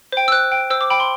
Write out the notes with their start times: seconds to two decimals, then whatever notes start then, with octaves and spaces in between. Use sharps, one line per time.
0.12 C5 G5
0.28 E6
0.32 C5 F#6
0.52 G5
0.70 C5 E6
0.81 D6
0.90 G5 B5
1.00 C6